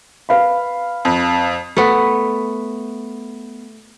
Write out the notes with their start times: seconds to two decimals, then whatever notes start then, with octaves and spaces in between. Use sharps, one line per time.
0.29 B4 F5 B5
1.05 F2
1.77 A3 B3